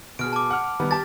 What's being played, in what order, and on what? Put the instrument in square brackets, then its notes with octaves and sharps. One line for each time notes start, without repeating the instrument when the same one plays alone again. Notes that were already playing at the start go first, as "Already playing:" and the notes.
[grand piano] B2 G#4 [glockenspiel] F6 D7
[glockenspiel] A5 D6
[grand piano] F#5 F6
D#3 G3 B3
[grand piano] G4 A5 [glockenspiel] A6